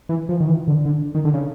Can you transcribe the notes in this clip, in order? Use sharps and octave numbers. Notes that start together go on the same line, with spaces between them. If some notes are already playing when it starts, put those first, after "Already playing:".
E3
F3
D#3
E3
D3
D3
D#3
D3
C#3